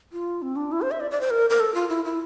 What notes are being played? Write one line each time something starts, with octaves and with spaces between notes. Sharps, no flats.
F4
C4
D4
E4
C5
E5
D5
D5
C5
A#4
A#4
A4
F4
E4
E4